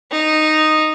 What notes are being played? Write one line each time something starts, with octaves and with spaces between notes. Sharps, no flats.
D#4